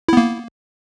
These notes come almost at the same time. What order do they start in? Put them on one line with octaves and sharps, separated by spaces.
E4 B3 A#3